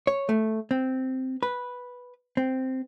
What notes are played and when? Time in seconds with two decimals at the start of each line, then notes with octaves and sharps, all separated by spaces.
0.07 C#5
0.29 A3
0.71 C4
1.43 B4
2.37 C4